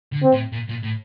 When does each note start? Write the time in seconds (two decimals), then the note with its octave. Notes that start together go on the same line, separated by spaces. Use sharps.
0.12 D3
0.23 C4
0.32 A2
0.52 A#2
0.68 A#2
0.83 A2